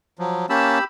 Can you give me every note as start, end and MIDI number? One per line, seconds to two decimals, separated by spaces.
0.19 0.46 53
0.19 0.46 54
0.50 0.79 58
0.50 0.79 61
0.50 0.84 67
0.50 0.79 81
0.50 0.84 83
0.50 0.84 88